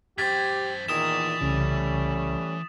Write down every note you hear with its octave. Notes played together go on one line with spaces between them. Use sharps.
F#2 G4 C5 G#6 A6 B6
E2 A#2 D#3 E3 D#6 E7
C2 C#3 G3 A3 C#4